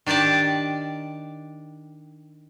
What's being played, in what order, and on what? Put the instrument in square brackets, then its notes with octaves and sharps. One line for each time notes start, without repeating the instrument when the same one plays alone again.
[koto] D#3 D4 G4 D5 A5